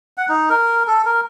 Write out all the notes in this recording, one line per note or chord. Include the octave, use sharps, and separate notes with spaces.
F#5
D#4
A#4
A4
A#4